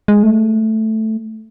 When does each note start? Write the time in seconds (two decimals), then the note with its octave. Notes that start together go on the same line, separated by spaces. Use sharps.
0.08 G#3
0.23 A3